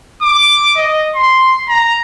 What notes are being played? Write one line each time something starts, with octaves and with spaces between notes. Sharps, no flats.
D6
D#5
C6
A#5